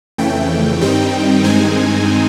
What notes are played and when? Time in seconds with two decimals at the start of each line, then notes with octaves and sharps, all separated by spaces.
0.18 F2 C#3 E3 A3 G5
0.81 G2 D#3 G3 C4 D#4 G5
1.44 G2 D#3 G#3 C4 D#4 G#5